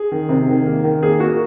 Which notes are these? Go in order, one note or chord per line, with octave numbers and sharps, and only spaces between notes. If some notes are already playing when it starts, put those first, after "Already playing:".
Already playing: G#4
D#3
C3
D#3
A#3
D#3
A#3 G#4
A#3 F#4